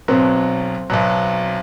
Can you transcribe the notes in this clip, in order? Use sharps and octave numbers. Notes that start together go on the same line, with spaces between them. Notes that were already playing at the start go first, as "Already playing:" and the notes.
B1 B2 F#3 C4
B1 B2 F#3